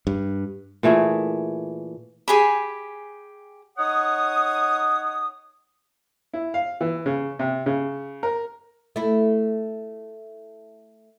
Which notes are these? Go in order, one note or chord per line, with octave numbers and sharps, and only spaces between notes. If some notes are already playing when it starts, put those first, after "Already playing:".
G2
A#2 E3 A3 G#4
G4 G#4 G#5 B5
D#4 C#5 F#5 D#6
E4
F5
E3
C#3
C3
C#3
A#4
A3 E4